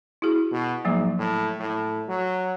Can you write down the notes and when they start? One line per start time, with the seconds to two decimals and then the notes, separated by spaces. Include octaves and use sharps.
0.22 E4 F#4 G#4
0.52 B2
0.85 G#2 F3 F#3 A#3
1.18 A2
1.60 A2
2.08 F#3